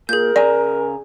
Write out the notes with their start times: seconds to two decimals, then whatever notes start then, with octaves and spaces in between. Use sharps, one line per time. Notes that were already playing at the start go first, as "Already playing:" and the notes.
0.09 A#2 G#4 A#4 G6
0.36 C#3 D5 G#5 A#5